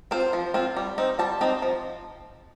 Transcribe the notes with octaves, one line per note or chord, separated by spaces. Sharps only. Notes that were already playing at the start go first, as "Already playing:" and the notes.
C4 F4 C5
F3
C4 F4
G3
C4 D#4
G3 A5
C4 D#4
F3